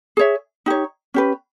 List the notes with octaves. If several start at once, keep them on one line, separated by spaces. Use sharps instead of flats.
G#4 C#5 E5
D#4 G4 C#5
C#4 G4 B4